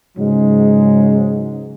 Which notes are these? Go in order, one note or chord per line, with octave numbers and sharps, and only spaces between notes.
G#2 C#3 F#3 G#3